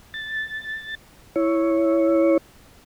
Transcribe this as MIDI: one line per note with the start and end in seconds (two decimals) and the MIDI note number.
0.14 0.95 93
1.36 2.37 64
1.36 2.37 73